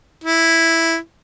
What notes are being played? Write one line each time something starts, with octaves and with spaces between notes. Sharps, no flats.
E4